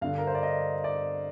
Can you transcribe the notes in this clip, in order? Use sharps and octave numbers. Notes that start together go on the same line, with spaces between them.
G2 D3 F5
A#4
C5
D5
D#5
D5